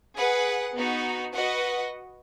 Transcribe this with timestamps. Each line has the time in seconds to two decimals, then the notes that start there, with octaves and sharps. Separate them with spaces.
0.16 G#4 B4 F#5
0.76 B3 D#4 F#4
1.35 F#4 B4 D#5 F#5